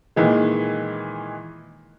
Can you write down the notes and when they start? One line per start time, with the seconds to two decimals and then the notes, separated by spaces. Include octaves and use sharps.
0.16 A#2 D#3 E3 G#3